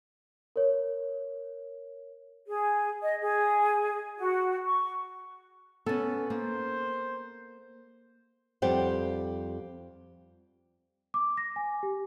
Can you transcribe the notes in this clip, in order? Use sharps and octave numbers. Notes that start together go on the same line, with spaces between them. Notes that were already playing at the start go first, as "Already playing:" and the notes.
A#4 C#5
G#4
D#5
G#4
F#4
C#6
B3 C#4 A4
A#3 C5
F2 G3 G4 C5 F#5
D6
A#6
G#5
G4